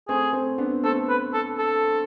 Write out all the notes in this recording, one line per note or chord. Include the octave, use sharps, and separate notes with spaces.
A3 C4 G#4
A3 C4
B3 D4
A3 C4 A4
B4
A4
A4